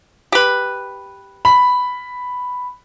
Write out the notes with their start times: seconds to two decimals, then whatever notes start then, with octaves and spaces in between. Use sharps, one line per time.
0.32 G4 B4
1.45 B5